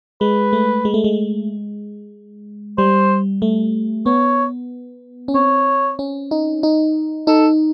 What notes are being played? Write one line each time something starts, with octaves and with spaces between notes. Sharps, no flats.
G#3 B4
A3
G#3
A3
G#3
G3 C5
A3
B3 C#5
C#4
C4 C#5
C#4
D#4
D#4
D#4 A4